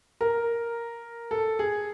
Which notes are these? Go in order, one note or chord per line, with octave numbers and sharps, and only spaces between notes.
A#4
A4
G#4